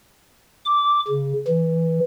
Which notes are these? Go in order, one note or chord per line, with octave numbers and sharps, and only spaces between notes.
D6
C#3
E3